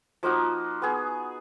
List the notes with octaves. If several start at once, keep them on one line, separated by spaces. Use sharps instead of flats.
F3 A#3 D#4 F#4
B3 G#4